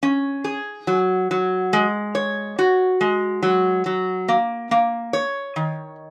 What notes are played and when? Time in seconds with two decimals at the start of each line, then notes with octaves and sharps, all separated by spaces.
0.03 C#4
0.44 G#4
0.87 F#3
1.31 F#3
1.73 G#3
2.15 C#5
2.59 F#4
3.01 G#3
3.43 F#3
3.86 F#3
4.28 A#3
4.71 A#3
5.13 C#5
5.56 D#3